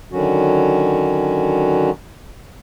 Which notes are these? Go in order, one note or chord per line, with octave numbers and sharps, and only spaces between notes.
D3 D#3 F#3 C#4 F#4